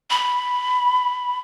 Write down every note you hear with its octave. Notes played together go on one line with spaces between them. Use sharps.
B5